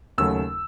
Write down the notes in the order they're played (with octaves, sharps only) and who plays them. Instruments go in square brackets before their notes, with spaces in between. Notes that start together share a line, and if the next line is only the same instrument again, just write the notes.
[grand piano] D#2 C#3 F#3 A3 E6